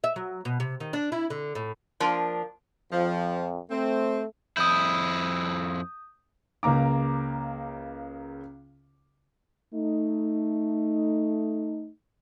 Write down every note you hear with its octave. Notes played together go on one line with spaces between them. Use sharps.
E5
F#3
B2
C3
D#3
D4
E4
D3
A2
F3 A#3 D4
F2 F3
A3 C4
F2 E4 D#6 G6
C#2 C#3 A#3 A#5 D6
A3 D#4